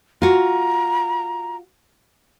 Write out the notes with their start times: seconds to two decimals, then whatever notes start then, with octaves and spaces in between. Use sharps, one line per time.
0.22 F4 F#4 A#5